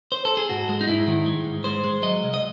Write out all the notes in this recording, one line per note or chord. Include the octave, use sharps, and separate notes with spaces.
C5
A4
G#4
G#2 F#4
G#3
D#4
G#2 E4
D#3
G#3
G#2
G#3 C5
G#3
F#3 D#5
C2
D#5